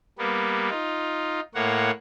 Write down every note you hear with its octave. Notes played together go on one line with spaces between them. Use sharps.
G3 A#3 B3
D#4 F4
A2 A#3 C#5 F#5